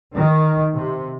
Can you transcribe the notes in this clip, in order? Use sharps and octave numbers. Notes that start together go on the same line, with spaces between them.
D#3
C3